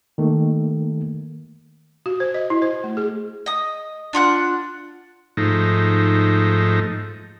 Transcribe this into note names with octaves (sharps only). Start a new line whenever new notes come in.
D#3 A3 A#3
F#4
C5
D#5
E4
C5
A3
G#4
D#5 D#6
D4 F4 F#5 F#6
G#2 F3 A3 D#4